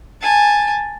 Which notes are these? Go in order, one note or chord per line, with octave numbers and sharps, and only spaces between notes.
G#5 A5